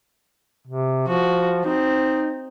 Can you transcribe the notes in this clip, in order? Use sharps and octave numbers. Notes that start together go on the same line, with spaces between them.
C3
F3 F#4
C4 D#4